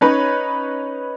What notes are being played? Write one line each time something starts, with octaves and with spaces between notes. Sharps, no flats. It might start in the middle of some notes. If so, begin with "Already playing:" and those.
C#4 D#4 B4 C#5